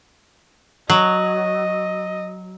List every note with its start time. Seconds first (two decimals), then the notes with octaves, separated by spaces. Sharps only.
0.90 F#3 D#5